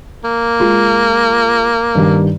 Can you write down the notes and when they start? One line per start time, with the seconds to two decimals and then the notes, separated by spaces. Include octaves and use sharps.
0.24 A#3
0.60 G#3 F4
1.95 G2 D#3 G3